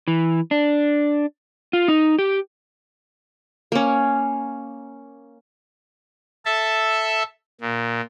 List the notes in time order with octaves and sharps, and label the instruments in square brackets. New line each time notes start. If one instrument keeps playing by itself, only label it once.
[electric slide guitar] E3
D4
F4
D#4
G4
[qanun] A#3 C#4
[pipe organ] A4 E5 A5
A#2